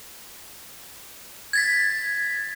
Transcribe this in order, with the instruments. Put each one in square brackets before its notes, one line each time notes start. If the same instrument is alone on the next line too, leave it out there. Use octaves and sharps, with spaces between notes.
[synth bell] G#6 A6 B6